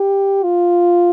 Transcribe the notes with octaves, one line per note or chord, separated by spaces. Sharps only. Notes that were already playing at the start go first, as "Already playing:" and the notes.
Already playing: G4
F4